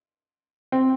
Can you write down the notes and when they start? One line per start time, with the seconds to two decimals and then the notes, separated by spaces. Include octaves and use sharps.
0.72 C4